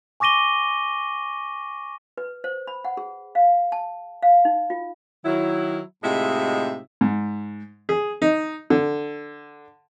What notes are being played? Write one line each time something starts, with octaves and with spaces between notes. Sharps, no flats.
G#5 C#6 D6 A#6 D#7 G7
B4
C5
B5
F#5
G#4
F5
A5
F5
D#4
F4
D#3 F#3 E4
A2 C3 G#3 D#4 F4 E5
G#2
G#4
D#4
D3